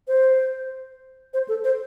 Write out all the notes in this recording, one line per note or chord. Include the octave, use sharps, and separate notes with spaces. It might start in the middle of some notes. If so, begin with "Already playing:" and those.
C5
C5
A4
C5